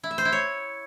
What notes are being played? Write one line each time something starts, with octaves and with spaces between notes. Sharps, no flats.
E4
E5
C5
E4
C#5